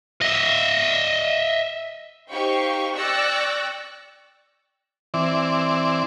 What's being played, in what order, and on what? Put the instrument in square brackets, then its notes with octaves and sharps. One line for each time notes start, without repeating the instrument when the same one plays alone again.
[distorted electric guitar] D#5 E5
[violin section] D#4 G4 C5 F5 G5 C#6
D5 G5 C#6 E6 F#6 A#6
[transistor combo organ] E3 C4 D5